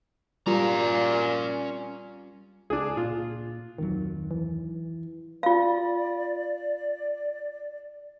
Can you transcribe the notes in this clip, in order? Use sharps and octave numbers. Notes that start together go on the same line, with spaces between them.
A#2 G3 C#4 F4 A#5
C#2 D4 G#4
A#2 F4
D1 F2 D#3 F#3
E3
F4 D5 F5